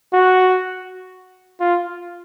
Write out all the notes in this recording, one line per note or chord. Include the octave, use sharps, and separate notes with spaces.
F#4
F4